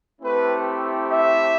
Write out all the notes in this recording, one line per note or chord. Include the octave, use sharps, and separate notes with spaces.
A3 C4 E4 G4 B4
E5